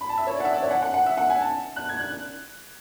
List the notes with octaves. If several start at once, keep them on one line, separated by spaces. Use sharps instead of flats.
B5
A5
E5
C#5
D5
F#5
E5
D5
C#5
F#5
F#5
F#5
E5
F#5
G#5
A5
F#6
G#6
F#6